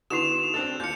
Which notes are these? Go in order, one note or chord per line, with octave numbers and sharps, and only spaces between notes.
D3 B3 D#4 E4 F#4 E7 F7
C4 D4 A4
D#2 F4 G6 C#7